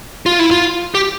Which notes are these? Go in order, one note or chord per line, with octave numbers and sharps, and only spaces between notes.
F4
E4
F4
G4